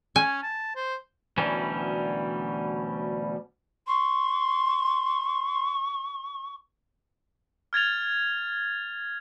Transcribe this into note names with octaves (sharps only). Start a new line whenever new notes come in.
C#4 G#5
A5
C5
D2 B2 E3 F#3 G3 C#4
C6 C#6
F6 G#6 A6 F7